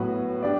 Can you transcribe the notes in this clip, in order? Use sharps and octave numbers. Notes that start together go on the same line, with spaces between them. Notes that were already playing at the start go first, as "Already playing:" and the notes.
Already playing: A2 F#3 B3 F#4 B4
D4 G4 D5